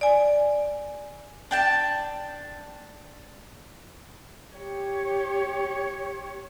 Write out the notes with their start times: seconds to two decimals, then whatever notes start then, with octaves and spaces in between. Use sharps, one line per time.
0.01 D5 G#5
1.51 D4 G5 A5
4.56 G4 C#5